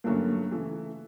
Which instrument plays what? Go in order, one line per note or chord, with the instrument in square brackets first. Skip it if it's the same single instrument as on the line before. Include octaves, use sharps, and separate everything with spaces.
[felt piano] G2 D3 F#3 A3 C#4 [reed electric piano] A#3
[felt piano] C#3 E3 A3